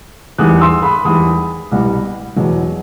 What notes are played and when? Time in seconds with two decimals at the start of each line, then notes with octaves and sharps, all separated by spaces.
0.38 E2 D#3 G3 D#6 F#6
0.61 C6 E6
0.82 B5 D#6
1.05 E2 D#3 G3 B5 D#6
1.72 C2 B2 G3
2.36 E2 B2 F#3